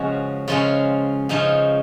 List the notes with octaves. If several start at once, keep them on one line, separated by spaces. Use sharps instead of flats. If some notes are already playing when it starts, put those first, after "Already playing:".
Already playing: C#3 F3 G#3 C#4 F#4
C#3 F3 G#3 C#4 F4
C#3 F3 G#3 C#4 D#4